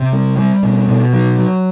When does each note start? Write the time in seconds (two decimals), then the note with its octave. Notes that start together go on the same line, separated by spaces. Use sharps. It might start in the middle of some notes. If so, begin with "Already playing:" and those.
Already playing: C3
0.12 G3
0.38 G3
0.63 B2
0.88 B2
1.13 F#3
1.39 F#3